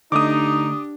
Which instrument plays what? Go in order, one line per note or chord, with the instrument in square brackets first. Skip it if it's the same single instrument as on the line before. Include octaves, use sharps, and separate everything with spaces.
[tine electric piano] D3 A3 [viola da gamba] D4 G4 [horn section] D#4 [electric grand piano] D6 D#6